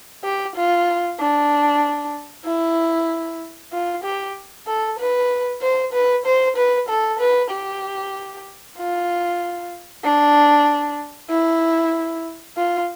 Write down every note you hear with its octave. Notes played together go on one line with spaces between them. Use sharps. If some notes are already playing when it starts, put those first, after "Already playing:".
G4
F4
D4
E4
F4
G4
A4
B4
C5
B4
C5
B4
A4
B4
G4
F4
D4
E4
F4